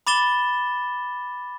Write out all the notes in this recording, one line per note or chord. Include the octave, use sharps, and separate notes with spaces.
B5 D6 A6 E7 G7